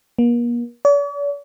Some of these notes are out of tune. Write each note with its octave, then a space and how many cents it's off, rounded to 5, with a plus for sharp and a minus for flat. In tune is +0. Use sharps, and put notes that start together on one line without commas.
A#3 +40
D5 -45